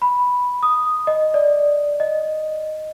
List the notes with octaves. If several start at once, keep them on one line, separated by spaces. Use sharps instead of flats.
B5
D#6
D#5
D5
D#5